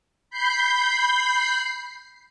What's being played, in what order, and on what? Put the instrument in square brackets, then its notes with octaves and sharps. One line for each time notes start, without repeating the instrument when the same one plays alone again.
[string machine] B5 G6 C7